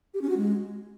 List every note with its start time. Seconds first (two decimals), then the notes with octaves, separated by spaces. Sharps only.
0.14 G4
0.22 C#4
0.29 F#4
0.37 G#3